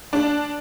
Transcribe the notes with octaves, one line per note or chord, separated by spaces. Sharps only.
D4